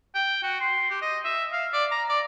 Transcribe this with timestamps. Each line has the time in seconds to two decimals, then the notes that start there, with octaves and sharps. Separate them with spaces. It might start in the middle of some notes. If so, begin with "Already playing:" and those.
0.15 G5
0.43 F#4
0.60 C6
0.90 G4
1.02 D#5
1.25 E5
1.53 F5
1.73 D5
1.91 A#5
2.09 D5